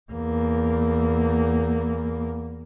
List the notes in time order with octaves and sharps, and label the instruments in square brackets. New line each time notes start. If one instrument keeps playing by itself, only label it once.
[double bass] E2 A#3